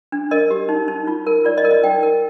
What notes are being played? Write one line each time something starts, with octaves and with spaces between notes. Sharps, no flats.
D4
A#4 D#5
G4
D#4
D#4
F4
A#4
F4 D5
D#5
A#4
D#5
D#4 G5
A#4